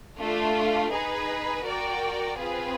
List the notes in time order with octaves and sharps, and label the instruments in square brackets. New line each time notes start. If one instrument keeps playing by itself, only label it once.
[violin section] A3 D4 F4
D#4 G#4 B4
F#4 A#4 D5 G5
C4 F4 G#4 B4